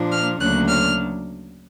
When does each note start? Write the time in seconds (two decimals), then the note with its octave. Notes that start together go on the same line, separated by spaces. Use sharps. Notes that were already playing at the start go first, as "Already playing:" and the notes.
Already playing: A#2 F3 A#3 D4
0.11 F6
0.40 D2 C#3 F#3 A#3 D4 F#6
0.68 F6